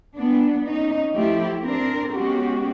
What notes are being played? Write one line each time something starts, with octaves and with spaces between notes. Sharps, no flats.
B3 D4
C#4 D#4
F3 A3 E4 G4
C4 D4 A#4
G#3 B3 C#4 F#4 G4